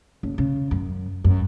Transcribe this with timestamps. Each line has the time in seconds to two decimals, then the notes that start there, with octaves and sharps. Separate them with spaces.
0.23 F#1
0.38 C#3
0.71 F#2
1.24 F#2